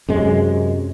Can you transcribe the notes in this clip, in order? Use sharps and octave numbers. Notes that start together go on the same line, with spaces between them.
F#2 C3 G#3